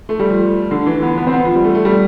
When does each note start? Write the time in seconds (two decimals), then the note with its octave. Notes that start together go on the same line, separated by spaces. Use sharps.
0.09 A3
0.19 G3
0.30 F3
0.71 D3
0.86 E3
1.02 B3
1.17 B3
1.27 C4
1.33 B3
1.45 F3
1.55 G3
1.64 A3
1.75 A3
1.85 G3